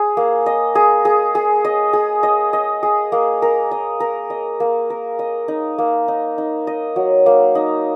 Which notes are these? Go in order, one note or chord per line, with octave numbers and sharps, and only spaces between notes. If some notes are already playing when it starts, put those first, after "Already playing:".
Already playing: G#4
A#3
D#5
G#4
G#4
G#4
D#5
G#4
D#5
D#5
G#4
A#3
A#4
D#5
A#4
D#5
A#3
A#4
D#5
D#4
A#3
D#4
D#4
D#5
F#3
A#3
D#4